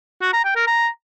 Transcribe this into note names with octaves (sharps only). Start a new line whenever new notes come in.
F#4
A#5
G5
A#4
A#5